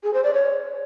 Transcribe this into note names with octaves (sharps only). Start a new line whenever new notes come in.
G#4
C5
D5
C#5